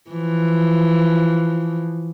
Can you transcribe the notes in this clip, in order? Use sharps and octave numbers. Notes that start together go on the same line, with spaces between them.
E3 F3